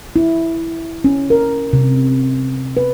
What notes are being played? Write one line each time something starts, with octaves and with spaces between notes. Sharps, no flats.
E4
C#4
A#4
C3
B4